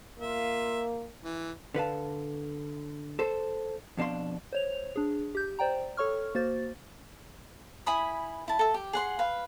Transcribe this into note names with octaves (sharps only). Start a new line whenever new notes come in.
A#3 F4 E5
E3
D3 B4 F5 A5
A4 C5
F2 B2 D4 F5 C6
C5 C#5 F7
D4 G#4
G4 G6
C5 D5 G5 A#5
A4 C#5 C#6 F6
A#3 F#4 C5 A6
E4 G#5 B5 D#6
E4 A5
A4 E5
G4
G#4 F#5 C6
B4 F5